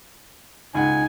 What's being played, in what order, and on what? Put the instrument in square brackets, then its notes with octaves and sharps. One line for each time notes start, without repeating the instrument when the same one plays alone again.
[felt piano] C#2 F#5 [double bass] D#4 [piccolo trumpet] G#5